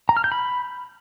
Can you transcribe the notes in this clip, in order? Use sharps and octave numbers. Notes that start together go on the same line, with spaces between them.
A#5
F6
G6
B5